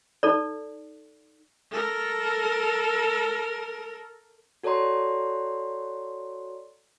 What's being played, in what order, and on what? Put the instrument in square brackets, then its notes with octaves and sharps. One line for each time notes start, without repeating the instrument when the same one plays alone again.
[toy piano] D#4 A4 D5
[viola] A4 A#4
[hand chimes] F#4 A4 C#5 D5 A#5 C6